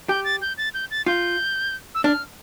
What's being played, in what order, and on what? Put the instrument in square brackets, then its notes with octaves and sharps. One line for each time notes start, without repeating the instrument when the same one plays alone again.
[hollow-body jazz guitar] G4 [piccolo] G6
[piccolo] A6
G6
A6
G6
A6
[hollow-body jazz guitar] F4 [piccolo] G6
[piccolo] E6
[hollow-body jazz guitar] D4 [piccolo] F6